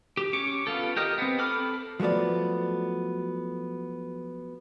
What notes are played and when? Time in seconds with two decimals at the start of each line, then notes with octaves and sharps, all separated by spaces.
0.17 G4
0.33 C#4 C#6 D6
0.67 B3 F4 A4
0.97 G4 A#4 D#5
1.18 B3 C4
1.39 A4 B5 D6 F6
2.00 F3 F#3 A3 B3 D5